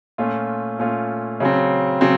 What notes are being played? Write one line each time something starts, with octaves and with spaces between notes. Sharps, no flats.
A#2 A3 C#4 F4
A#2 A3 C#4 F4
C#3 F#3 C4
C#3 F#3 C4